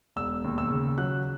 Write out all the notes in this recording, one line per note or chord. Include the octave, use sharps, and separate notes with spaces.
E1 E6
D#2
E6
C#3
F#3 F#6